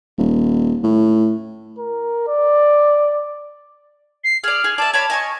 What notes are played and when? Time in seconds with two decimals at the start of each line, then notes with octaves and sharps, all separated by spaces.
0.18 D#1
0.84 A2
1.78 A#4
2.28 D5
4.24 C7
4.44 G#4 D5 F6
4.64 G#4
4.78 D5 E5 A5
4.94 C#5 D5 A5 B5
5.10 D#5 G#5 C#6